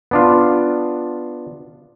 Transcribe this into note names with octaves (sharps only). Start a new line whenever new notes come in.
B3 D4 F4